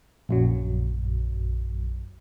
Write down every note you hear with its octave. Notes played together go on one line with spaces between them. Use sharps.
A#1 F#2 F#3